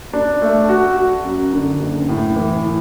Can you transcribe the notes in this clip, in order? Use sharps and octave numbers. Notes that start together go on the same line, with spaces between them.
D4
A3
F#4
F#4
F#2
D3
F#1
A2
E3
A2